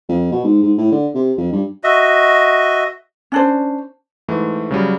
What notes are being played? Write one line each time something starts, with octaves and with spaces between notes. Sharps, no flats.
F2
B2
G#2
G#2
A2
D3
C3
F2
G2
F#4 D#5 E5
C#4 D4 C5
G#2 E3 A3
C#3 F#3 G3